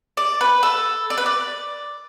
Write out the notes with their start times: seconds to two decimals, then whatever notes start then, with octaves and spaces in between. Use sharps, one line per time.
0.17 D5
0.41 B4
0.63 A4
1.10 D5
1.18 B4
1.26 D5